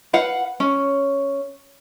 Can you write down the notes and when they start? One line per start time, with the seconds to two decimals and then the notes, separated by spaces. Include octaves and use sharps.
0.13 B4 F5 F#5
0.60 C#4